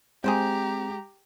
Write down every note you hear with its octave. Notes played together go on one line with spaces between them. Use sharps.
G#3 C4 G4 G#4 C5 G5 A#5